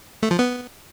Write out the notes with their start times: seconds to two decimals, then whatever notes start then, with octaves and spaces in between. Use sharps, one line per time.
0.23 A3
0.31 F3
0.39 B3